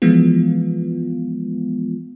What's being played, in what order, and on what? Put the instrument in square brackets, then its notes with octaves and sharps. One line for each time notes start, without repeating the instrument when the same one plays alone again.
[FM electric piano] E3 F3 G#3 B3 F4